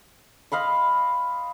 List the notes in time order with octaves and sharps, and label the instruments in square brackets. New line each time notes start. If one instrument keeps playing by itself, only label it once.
[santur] D#5 F5 B5 C6